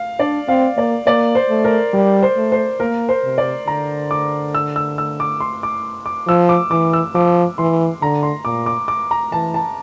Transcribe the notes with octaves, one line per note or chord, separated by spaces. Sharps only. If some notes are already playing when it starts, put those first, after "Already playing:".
Already playing: F5
D4 D5
C4 F5
A#3 D5
A#3 D5
C5
A3
A#4
G3 A#4
C5
A3
C5
A#3 A#4
C5
C3
D5
D3 A#5
D6
E6
E6
E6
D6
C6
D6
D6
F3 E6
D6
E3 D6
E6
F3 D6
E3 C6
D3 A#5
C6
A#2 D6
D6
D6
A#5
E3 A5
A5